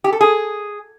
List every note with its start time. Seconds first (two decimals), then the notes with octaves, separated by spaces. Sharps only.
0.04 G4
0.12 A4
0.21 G#4